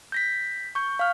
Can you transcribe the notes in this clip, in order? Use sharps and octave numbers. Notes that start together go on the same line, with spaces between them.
G6 A#6 B6
C#6 G6
F5 F6